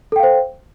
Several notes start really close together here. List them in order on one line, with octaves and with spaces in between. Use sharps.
A4 G5 F5 C5